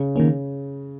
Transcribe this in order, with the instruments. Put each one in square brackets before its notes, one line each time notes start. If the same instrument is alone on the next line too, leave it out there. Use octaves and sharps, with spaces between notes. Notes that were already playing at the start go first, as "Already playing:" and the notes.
Already playing: [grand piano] C#3
[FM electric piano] D#3 A#3 C#4